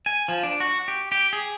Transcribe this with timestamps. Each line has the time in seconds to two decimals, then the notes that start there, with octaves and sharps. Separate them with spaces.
0.06 G#5
0.28 F3
0.43 D4
0.60 F#4
0.88 G4
1.12 G4
1.33 G#4